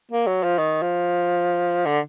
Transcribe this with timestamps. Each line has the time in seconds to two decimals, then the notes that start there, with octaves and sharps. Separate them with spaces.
0.11 A#3
0.27 F#3
0.43 F3
0.58 D#3
0.82 F3
1.86 D3